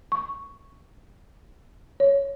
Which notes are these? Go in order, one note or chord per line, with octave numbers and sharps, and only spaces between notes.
C#6
C#5